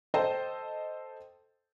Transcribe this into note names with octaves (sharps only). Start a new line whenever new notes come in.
A4 C5 D#5 G5 A5